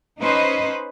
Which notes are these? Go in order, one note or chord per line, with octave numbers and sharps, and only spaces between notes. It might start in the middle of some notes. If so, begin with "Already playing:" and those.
C#4 D#4 B4 C5 D#5